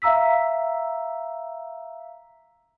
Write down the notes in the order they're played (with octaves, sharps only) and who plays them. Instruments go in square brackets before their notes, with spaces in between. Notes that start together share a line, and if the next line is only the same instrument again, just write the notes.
[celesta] E5 F5 A#5 E6 B6